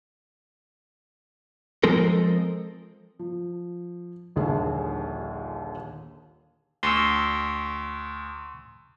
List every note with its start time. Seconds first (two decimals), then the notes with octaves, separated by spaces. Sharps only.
1.83 F3 G#3 C4 A4 A#4
3.19 F3
4.36 D#1 A#1 D#2 D3 G#4 A5
6.83 D2 C6 C#6 E6